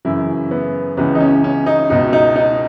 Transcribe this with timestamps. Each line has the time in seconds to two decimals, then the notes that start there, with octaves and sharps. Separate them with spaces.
0.05 F#2 C#3 E3 E4
0.51 B3
0.97 C#2 C#3 E3 B3
1.15 D#4
1.20 C#4
1.44 C#4
1.66 D#4
1.90 C#2 B2 D#4
2.13 D#4
2.36 D#4